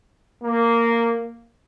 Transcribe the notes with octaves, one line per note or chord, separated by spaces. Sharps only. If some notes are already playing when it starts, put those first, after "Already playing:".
A#3